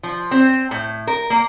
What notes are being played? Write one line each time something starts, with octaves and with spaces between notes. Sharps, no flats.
F3
C4
A2
A#4
A#3